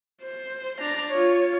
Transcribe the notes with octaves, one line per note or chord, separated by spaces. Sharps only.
C5
D4 A#5
F4 C#5